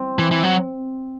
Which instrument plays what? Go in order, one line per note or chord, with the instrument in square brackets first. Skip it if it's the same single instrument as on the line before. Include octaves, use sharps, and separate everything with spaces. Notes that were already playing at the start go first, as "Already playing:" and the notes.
Already playing: [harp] C4
[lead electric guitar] E3
E3
F#3